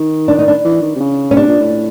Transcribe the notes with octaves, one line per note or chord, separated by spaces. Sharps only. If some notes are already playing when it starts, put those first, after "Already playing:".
Already playing: D#3
D4
D#4
D4
E3
D#3
C3
C#3
C#4
C3 D4
A#2
A2